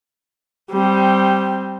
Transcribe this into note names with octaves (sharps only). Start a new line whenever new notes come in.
G3 C4